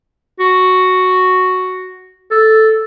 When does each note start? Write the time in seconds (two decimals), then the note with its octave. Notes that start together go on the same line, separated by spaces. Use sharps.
0.39 F#4
2.31 A4